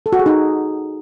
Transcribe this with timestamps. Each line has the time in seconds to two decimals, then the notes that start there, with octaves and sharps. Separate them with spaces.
0.06 A4
0.13 F#4
0.19 G#4
0.26 D#4